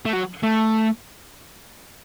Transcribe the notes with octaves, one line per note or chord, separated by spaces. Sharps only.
A3
F#3
A3